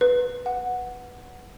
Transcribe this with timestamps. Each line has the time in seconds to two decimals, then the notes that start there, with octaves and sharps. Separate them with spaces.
0.01 B4
0.46 F#5